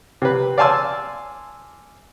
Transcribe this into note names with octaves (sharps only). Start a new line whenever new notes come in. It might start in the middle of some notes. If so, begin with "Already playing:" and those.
C3 B4
D5 F5 G#5 A5 C6 E6